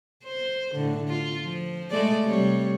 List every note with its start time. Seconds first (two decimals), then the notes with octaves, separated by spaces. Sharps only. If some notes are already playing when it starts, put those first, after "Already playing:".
0.24 C5
0.75 A2 D3
1.08 F4
1.44 F3
1.91 G#3 A3 D5
2.24 C3 G3 C#5